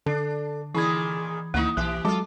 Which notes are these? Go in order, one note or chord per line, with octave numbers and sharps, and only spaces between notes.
D3 D4 A4
A#2 D#3 E3 E4 G#4 B5 G#6
D2 D#3 A#3 D#4 E4
B1 E3 G4 F#6
F#3 G#3 F4 A4 A5 D6